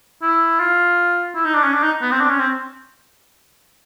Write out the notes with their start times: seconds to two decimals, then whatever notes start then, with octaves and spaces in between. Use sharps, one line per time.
0.22 E4
0.60 F4
1.35 E4
1.45 D#4
1.55 D4
1.64 C#4
1.74 D4
1.83 D#4
2.02 B3
2.11 C4
2.21 D4
2.31 C#4
2.40 C4